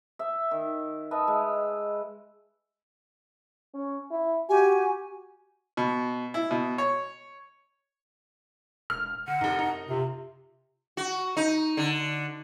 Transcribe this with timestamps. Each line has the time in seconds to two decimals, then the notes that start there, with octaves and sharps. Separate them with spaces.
0.19 E5
0.51 D#3
1.11 B4 D#5 E5 A5
1.27 G#3
3.74 C#4
4.11 E4
4.49 F#4 G4 G#5
5.77 B2
6.34 E4
6.51 B2
6.78 C#5
8.90 E1 F6
9.28 D3 F#5
9.41 F1 F#2 D#4
9.59 D#4
9.89 C3 F4
10.97 F#4
11.37 D#4
11.77 D3